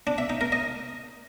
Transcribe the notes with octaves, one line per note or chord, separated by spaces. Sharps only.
D4
E5
D#4
A#4
D#5